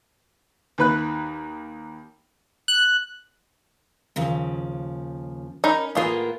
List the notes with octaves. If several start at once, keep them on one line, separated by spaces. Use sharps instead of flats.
D#2 D#4 B4 B5 F#6
F#6
D#2 C#3 F3
C#4 D#4 A#4 B5
A2 A#3 B3 F4 G#4